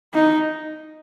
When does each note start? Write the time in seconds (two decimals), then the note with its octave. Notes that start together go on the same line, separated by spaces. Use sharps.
0.14 D#4